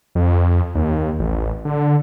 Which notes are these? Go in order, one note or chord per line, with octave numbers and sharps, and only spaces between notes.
F2
D#2
A1
D3